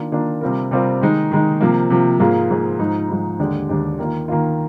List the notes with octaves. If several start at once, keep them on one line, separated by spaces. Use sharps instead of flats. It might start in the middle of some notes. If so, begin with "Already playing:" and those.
Already playing: D#3 A#3 D4 F4
D#3 A#3 D4 F4
C3 G3 C4 F4 A#4
C3 G3 C4 F4 A#4
D#3 G#3 D#4
D#3 G#3 D#4
C3 F3 A#3
C3 F3 A#3
G#2 F3 A#3 F4 G#4
G#2 F3 A#3 F4 G#4
G#2 F3 G#3 D#4
G#2 F3 G#3 D#4
D#2 D3 G#3 D4 G4
D#2 D3 G#3 D4 G4
D#3 A#3 F4
D#3 A#3 F4